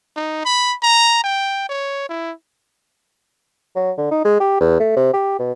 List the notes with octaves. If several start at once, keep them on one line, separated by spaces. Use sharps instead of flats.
D#4
B5
A#5
G5
C#5
E4
F#3
D3
D#4
G#3
G4
E2
A3
C3
G4
B2